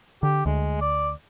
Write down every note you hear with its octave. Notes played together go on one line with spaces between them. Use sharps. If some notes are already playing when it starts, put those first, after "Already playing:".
D3 G4
D2 G#3
D5